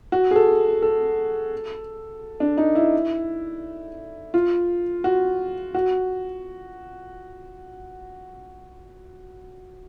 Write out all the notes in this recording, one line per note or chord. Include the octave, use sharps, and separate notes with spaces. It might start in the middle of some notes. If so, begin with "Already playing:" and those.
F#4
G#4
A4
A4
D4
D#4
E4
F4
F#4
F#4